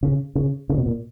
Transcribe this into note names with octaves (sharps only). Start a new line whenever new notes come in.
C#3
C#3
C#3
B2
A#2